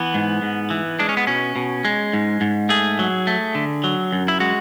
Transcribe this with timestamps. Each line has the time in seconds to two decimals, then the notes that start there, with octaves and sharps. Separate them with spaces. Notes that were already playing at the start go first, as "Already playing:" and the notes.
Already playing: E3 B3
0.14 G#2
0.42 G#2
0.70 E3
0.99 G#3 D4
1.09 C#4
1.17 B3
1.27 B2 C#4
1.56 B2
1.85 G#3
2.13 G#2
2.41 G#2
2.69 A3 G#4
2.99 F#3
3.27 A3
3.55 D3
3.84 F#3
4.13 F#2
4.28 E4
4.40 G#3 F#4